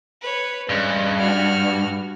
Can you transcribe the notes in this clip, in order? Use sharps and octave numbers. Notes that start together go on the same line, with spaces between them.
B4 C#5
G2 G#3 C#4
F#4 F6